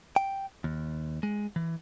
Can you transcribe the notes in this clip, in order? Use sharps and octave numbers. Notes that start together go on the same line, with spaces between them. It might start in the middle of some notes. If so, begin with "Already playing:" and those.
G5
D#2
G#3
E3